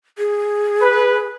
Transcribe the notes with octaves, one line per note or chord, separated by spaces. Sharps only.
G#4
B4